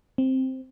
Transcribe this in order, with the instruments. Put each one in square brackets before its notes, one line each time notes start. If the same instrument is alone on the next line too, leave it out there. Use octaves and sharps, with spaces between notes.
[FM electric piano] C4